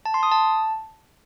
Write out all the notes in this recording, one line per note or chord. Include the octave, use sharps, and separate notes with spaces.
A5
C6
D#6
A5